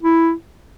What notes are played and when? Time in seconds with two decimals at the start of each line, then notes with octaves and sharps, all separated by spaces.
0.03 E4